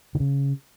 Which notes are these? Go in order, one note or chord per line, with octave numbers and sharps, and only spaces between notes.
D3
C#3